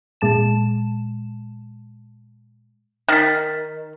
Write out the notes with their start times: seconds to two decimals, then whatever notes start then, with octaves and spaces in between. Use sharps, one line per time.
0.21 A#2 G#3 A5 E7
3.08 D#3 F6 A6 B6